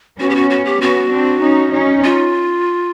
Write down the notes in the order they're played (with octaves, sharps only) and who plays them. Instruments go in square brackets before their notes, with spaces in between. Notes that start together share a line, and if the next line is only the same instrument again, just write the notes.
[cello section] B3 C#4 [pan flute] F#4
[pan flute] G4
F#4
F#4
G4
[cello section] B3 C#4 [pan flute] F#4
[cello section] C4 D4
C#4 D#4
C#4 D#4
[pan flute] F4